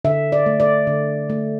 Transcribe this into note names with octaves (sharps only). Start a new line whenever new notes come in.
D3 E5
D5
A3
D5
D3
A3